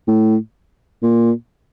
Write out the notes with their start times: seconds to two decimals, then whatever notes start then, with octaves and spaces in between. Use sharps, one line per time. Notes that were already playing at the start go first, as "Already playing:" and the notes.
0.08 A2
1.03 A#2